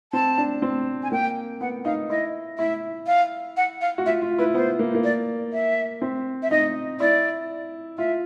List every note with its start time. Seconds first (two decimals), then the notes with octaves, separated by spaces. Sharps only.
0.13 C4 A5
0.38 D4
0.62 C4
1.03 G#5
1.12 A#3 G5
1.61 B3 F#5
1.85 D#4 F5
2.10 E4 D#5
2.58 E4 E5
3.07 F5
3.57 F#5
3.81 F5
3.98 F#4
4.06 F4 E5
4.22 F4
4.38 E4 B4
4.54 B3 C5
4.79 A#3
4.95 A#3
5.04 D5
5.53 E5
6.02 C4
6.43 E5
6.51 D#4 D#5
7.00 E4 D5
7.98 F4 E5